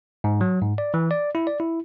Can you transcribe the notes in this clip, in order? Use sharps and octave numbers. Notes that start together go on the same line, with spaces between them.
G#2
F#3
G#2
D5
E3
D5
E4
D5
E4